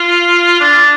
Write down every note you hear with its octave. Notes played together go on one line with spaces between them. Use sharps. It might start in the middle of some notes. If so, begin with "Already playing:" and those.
Already playing: F4
D4